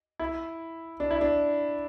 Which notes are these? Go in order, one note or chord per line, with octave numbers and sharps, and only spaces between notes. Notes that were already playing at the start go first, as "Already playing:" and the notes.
E4
D4
E4
D4